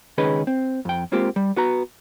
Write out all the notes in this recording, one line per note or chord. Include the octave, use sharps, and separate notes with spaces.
C#2 D#3 C#4 G#4 B4 D#5
C4
F2 G5
G#3 A#3 C4 F4 G4
G3
B3 F#4 B4 A#5